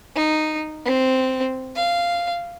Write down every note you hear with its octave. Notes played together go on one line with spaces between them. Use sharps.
D#4
C4
F5